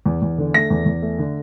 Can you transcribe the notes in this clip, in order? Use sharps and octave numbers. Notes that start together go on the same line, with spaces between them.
E2
E2
D3
A3 A#6
E2
E2
A3
D3